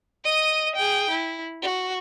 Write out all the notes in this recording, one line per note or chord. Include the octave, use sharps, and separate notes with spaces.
D#5 D#7
G#4 G5
E4
F#4